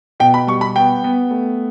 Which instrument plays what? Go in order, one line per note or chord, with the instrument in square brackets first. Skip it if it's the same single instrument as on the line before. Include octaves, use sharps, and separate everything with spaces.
[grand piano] B2 G5
B5
G3 C#6
B5
B3 G5
B3
A3